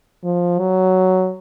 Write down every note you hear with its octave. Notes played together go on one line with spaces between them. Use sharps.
F3
F#3